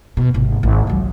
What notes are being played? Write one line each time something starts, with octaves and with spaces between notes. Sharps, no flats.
B2
G#1 C3
G#1
C#2 F#3